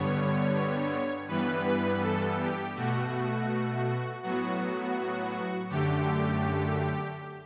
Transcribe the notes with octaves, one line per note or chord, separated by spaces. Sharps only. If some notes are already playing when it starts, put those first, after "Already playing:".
Already playing: G2 D3 G3 B3 C#5
G2 E3 G3 B3 B4
B4
A4
G4
B2 A3 F#4
A2 F#3 B3 F#4
F#2 D3 A3 G4